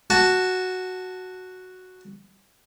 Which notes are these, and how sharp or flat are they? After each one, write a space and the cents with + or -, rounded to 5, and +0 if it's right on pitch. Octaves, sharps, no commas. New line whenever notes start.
F#4 +0 A5 +0